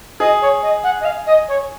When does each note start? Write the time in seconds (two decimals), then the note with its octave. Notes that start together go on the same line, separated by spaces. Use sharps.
0.20 G#4 D#5
0.42 C#5
0.63 D#5
0.84 F#5
1.01 D#5
1.05 F5
1.26 D#5
1.48 C#5